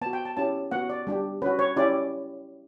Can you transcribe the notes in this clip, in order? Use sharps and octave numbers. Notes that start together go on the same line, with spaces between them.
B3 F#4 A5
G5
A5
C#4 E4 G4 A5
B3 F#4 F#5
D5
G3 D4 G4
C#4 F#4 B4
C#5
C#4 E4 G4 D5